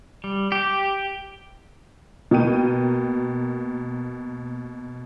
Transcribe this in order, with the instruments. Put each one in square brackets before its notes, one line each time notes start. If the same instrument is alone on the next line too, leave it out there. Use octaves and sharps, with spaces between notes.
[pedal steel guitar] G3
G4
[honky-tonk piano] B2 A#3 G5 D#7